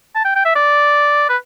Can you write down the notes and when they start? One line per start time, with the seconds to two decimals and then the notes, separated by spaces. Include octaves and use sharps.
0.15 A5
0.25 G5
0.36 G5
0.45 E5
0.56 D5
1.29 B4